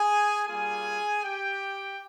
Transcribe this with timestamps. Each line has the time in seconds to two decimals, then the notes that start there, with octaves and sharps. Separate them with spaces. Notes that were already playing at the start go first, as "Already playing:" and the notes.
Already playing: G#4 G#5
0.47 G3 A#3 F4 G#4 G#5
1.23 G4 G5